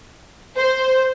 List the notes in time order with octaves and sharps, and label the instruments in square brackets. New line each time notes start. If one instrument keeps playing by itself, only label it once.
[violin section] C5